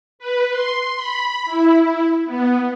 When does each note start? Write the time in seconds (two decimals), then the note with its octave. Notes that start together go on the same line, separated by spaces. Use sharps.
0.19 B4
0.51 C6
0.95 B5
1.45 E4
2.25 B3